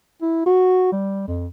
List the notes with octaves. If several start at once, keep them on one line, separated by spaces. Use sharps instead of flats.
E4
F#4
G3
F2